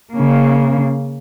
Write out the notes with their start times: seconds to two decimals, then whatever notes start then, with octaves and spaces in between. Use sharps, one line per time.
0.13 C#3 A#3